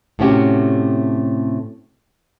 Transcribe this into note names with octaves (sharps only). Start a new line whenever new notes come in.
A2 C3 A3 C#4 F#4 G4